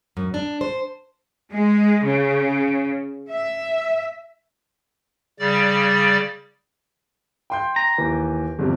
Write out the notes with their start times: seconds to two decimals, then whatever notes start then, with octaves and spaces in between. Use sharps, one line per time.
0.17 F#2
0.34 D4
0.61 C5
1.52 G#3
2.04 C#3
3.29 E5
5.39 C#3 G3 D5 A6
7.50 G5 C6 G6
7.76 A#5
7.98 D#2 E3
8.59 G1 C3 F3